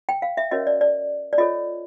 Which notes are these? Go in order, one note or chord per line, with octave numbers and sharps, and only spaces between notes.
G5
F5
E5
C#4 F#4 A#4 C#5 D#5
D5
D5
D5
F4 A4 C#5 D#5